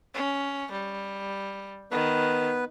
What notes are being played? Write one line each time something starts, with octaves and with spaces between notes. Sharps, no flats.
C#4
G3
D#3 B3 B4